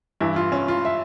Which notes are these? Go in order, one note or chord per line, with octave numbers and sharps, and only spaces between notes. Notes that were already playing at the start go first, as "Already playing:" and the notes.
G2 E3 E4
F4
C#4
F4
E5